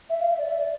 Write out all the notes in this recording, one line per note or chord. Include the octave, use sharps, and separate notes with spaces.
E5
F5
E5
D5
E5
D5